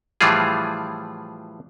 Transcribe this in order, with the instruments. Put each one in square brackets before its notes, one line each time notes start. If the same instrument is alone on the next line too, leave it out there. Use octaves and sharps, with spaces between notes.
[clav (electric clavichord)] A2 E3 F3 G3 F4 G#4